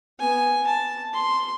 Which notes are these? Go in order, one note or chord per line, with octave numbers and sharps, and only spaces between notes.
B3 G#5
A5
C6